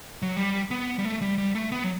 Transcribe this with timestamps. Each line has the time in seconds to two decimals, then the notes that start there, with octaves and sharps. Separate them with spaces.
0.22 F#3
0.37 G3
0.71 B3
0.99 G3
1.04 A3
1.21 G3
1.38 G3
1.55 A3
1.72 B3
1.84 F#3